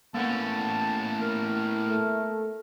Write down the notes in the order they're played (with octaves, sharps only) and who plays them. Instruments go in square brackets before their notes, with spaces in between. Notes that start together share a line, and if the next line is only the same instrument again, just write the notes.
[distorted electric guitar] A2 C#4 [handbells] A#3 B3 [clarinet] A5
[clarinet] A#4
[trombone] A3